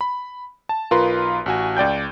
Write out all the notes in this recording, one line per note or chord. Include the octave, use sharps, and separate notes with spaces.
B5
A5
B1 F4 A#4 B4 C6
A1 F#4 G#5
C#2 D5 G5 G6